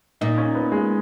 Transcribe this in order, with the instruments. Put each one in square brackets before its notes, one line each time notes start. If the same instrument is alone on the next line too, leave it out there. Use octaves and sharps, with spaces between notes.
[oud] A#2 [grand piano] D#4
[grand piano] C#4
B3
G#3